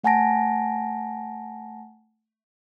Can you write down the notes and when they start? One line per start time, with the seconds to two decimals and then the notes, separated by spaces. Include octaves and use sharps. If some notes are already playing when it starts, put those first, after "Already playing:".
0.04 A3 F#5 G#5 A5 A#6 D7